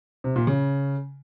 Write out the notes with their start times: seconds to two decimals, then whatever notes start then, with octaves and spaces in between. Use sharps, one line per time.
0.24 C3
0.36 A#2
0.47 C#3